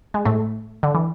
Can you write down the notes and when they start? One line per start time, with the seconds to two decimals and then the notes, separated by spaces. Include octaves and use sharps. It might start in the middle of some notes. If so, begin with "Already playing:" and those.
0.14 G#3
0.25 A2 A3
0.83 D3
0.94 E3